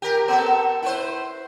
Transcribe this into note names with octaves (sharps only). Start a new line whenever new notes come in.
G4 A#4
B3 A4
E4 B4 C5